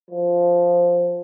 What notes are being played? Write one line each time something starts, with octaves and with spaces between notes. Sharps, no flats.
F3